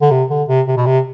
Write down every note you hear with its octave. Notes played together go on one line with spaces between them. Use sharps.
D3
C3
D3
C3
C3
B2
C3